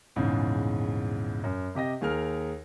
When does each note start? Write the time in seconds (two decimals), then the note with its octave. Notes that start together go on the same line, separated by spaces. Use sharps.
0.16 A#1 E2 G#2 C#3
1.44 F#2
1.75 C3 G4 D#5 A#6
2.01 D#2 G#4 A#4 F6